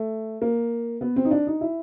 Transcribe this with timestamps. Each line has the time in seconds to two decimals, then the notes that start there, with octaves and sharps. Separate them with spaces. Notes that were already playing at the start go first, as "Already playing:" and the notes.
Already playing: A3
0.42 A#3
1.01 B3
1.16 C4
1.25 D#4
1.31 D4
1.47 D#4
1.61 E4